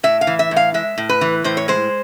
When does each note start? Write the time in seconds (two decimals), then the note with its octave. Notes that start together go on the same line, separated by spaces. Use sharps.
0.03 A2 E5
0.21 F5
0.27 E3
0.39 E5
0.51 A2
0.56 F5
0.74 G#3 E5
0.98 A2
1.09 B4
1.21 E3
1.44 A2 C5
1.57 C#5
1.68 G#3 C5